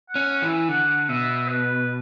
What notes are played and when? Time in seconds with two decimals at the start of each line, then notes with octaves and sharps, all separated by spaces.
0.09 F#5
0.15 C#4
0.29 F#5
0.42 E3
0.49 E5
0.68 D3 F#5
1.09 B2 E5
1.49 B4